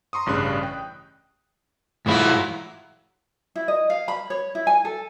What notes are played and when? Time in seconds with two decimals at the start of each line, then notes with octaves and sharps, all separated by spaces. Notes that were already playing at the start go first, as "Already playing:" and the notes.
0.13 A#5 C6 C#6 D#6
0.26 A1 G2 C#3 F#6
0.63 G5
2.06 G#2 E3 F#3 E4 F4
3.56 E4
3.68 D#5
3.90 F5
4.08 B5
4.30 C#5
4.55 E4
4.67 G#5
4.85 A4